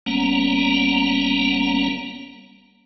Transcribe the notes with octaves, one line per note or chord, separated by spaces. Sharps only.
F#1 G3 A#3 B3 C#4 A#5